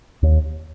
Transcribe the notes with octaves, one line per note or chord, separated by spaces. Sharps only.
D#2